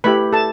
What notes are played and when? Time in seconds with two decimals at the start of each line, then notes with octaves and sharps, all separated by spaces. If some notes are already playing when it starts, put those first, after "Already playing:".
0.04 A3 E4 G4 B4 B5
0.33 A4 A5